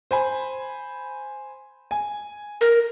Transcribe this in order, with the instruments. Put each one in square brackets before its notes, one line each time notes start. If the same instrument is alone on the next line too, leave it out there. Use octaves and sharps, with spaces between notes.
[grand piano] C5 G#5 B5
G#5
[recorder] A#4